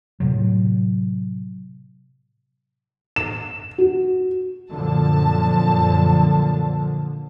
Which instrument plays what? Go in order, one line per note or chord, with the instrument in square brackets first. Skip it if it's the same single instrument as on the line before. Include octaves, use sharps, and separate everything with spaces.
[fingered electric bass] A2 C3 F#3
[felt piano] E7
F#4
[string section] F#2 A5 [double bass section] A#2 D3 F3